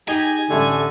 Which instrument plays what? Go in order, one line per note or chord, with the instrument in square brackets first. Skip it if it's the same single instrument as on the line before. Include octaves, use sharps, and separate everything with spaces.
[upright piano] D#4 F7 G7 [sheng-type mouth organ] G4 G#4 D#5 [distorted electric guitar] G#5
[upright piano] A1 G4 [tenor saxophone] D3 [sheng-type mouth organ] A3